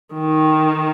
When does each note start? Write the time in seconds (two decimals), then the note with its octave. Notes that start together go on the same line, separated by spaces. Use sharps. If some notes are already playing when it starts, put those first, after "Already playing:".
0.13 D#3